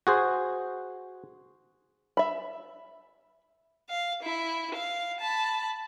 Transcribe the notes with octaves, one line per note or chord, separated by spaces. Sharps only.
F#4 G#4 C5
E5 B5
F5
E4
F5
A5 B5